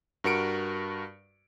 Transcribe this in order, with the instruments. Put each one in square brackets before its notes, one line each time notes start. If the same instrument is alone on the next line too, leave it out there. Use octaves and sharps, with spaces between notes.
[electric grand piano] G2 F#4 A#4 C#7 D7